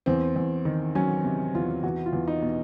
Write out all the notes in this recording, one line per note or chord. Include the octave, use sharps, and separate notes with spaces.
E2 C4
E2
D#3
F#3 C#4
C3
E2 F4
E2 F#4
F4
E2
D#4
B2